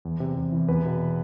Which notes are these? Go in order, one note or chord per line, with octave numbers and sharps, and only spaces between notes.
E2
C3
E2
E3
E2 B4
B2